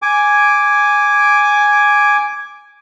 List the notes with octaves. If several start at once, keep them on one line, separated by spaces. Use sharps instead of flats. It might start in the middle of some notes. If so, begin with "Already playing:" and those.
G#5 D6